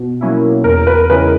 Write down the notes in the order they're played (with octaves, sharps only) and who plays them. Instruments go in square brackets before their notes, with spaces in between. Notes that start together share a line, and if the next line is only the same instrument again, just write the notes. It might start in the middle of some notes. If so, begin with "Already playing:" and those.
Already playing: [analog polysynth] B2
F#3 A#3 C#4 E4
[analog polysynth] E2 [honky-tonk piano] A#4
[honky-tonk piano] B4
[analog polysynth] C#3 E3 G#3 [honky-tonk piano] B4